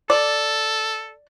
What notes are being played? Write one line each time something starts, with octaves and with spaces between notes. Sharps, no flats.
A4 D5